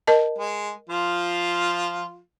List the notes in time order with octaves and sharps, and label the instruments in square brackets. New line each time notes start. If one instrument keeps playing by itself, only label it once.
[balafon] A#4 D#5 A5
[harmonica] G#3
F3 F4